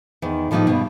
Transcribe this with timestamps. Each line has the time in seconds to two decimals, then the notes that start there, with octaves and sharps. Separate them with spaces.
0.22 E2 D#3
0.51 A2 D#3 F3 A#3 D#4 G4
0.67 G2 B2